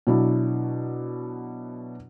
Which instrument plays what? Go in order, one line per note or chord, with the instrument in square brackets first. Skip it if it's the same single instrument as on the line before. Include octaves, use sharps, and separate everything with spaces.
[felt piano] B2 F#3 D4 E4